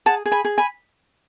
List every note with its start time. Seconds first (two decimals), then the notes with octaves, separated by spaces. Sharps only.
0.06 G#4 F#5 A5
0.26 G#4
0.32 G#5 B5
0.45 G#4
0.58 G#5 B5